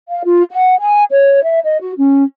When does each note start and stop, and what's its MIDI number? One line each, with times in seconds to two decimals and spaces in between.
0.10 0.21 77
0.25 0.43 65
0.51 0.78 78
0.80 1.05 80
1.11 1.42 73
1.44 1.60 76
1.64 1.77 75
1.80 1.93 66
1.97 2.25 61